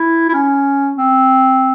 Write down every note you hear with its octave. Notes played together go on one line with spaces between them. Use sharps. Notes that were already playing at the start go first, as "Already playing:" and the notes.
Already playing: E4
E4
C#4
C4